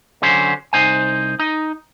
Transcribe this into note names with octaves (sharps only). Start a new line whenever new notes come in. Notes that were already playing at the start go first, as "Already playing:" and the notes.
D3 F#3 C#4 C5
C2 D#4 C5 G#5
D#4